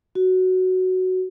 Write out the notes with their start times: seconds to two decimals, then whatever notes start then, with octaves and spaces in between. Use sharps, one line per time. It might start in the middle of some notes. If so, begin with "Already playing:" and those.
0.15 F#4